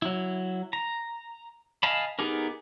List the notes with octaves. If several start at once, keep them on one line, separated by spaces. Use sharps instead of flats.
F#3 E4
A#5
D#5 F5 G#5 A5 B5
B3 D#4 G4 G#4 A#4